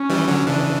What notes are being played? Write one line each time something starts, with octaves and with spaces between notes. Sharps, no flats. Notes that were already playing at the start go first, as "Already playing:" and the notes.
Already playing: C#4
E3 G3
D3 F#3
C#3 E3 D4